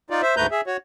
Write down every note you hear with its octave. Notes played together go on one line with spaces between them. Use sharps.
D#4 F4 D5
C5 E5
D2 G#2 A3 B4 A#5 G6
G#4 E5
F#4 C#5